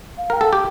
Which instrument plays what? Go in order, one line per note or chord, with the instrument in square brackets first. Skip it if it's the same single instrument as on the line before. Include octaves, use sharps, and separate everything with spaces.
[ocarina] F5
[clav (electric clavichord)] A#4 [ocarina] G5
[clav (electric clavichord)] A4 [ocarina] F5
[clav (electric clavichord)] G4 [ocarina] G5